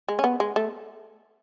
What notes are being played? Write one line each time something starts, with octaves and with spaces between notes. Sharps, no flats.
G#3
C#4
B3
G#3
A3